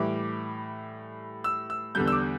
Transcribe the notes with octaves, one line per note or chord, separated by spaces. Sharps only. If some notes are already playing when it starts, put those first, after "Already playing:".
Already playing: A2 E3 G3 D6
E6
E6
E2 D3 G3 G6
E6
D6